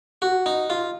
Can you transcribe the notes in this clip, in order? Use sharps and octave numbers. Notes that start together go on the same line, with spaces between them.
F#4
D#4
F4